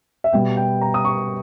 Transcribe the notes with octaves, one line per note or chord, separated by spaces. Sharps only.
E5
B2 G3 B3 G5
G5
A#5
D#6
C#6